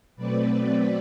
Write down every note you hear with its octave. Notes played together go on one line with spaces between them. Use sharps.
B2 F#3 A3 C4 B4 D5